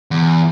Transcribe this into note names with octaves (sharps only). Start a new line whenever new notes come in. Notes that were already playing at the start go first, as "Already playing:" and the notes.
E2